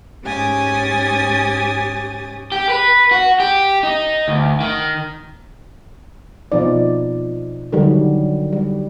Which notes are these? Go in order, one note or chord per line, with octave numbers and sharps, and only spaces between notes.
G#2 C#4 G4 G#5 D#6 A6
G4
B4
F#4
G4
D#4
D2
D#3
B2 F3 D#4 D5
D3 D#3 F#3 G3
G3